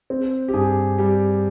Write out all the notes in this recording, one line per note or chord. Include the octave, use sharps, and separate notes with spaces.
C4
G4
G2 G#4
G3 G4